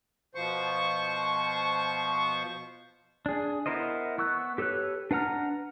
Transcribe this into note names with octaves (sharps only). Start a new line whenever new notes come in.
B2 F3 C5 C#6
D4 G#4
B3 E4 A#4 C5 D#5
B3 C#6 E6 F#6
G4 A4 B4 C#5 F#6
D4 B4 F#5 A#5 F6